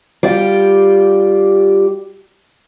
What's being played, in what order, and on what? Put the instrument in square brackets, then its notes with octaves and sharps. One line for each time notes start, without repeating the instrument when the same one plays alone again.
[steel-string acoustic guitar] G3 F4 G4